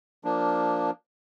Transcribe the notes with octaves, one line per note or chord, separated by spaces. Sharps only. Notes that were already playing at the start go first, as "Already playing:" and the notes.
F3 A#3 D4